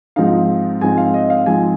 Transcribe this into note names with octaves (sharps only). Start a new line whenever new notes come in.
G#2 F3 C4 D#4 F5
G#2 F3 C4 D#4 G#5
F5
D#5
F5
G#2 F3 C4 D#4 G#5